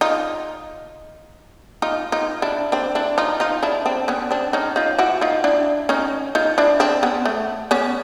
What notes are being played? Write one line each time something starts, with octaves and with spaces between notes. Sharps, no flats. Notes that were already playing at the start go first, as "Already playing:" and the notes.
D#4 F4
D#4 F4
D#4 F4
D4 E4
C4 D4
D4 E4
D#4 F4
D#4 F4
D4 E4
C4 D4
B3 C#4
C4 D4
C#4 D#4
D#4 F4
E4 F#4
D#4 F4
D4 E4
C#4 D#4
D#4 F4
D4 E4
C4 D4
B3 C#4
A3
B3 C#4